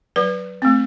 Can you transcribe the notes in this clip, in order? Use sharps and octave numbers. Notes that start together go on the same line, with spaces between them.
F#3 B4
A3 C4